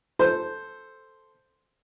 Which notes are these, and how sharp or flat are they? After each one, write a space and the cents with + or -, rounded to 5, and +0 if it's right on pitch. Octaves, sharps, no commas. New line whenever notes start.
A4 +0 C5 +0